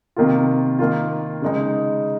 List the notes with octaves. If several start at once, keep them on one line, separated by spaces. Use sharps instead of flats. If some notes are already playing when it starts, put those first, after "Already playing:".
C3 D#3 A#3 F4
D#3 A#3 F4
C#3 G#3 D#4